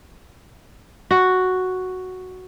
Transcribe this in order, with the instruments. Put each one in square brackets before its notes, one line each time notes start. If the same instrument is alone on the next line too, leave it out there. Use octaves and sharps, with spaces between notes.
[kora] F#4